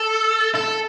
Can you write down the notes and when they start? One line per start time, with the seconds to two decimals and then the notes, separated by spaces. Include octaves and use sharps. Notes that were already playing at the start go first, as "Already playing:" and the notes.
Already playing: A4
0.55 A4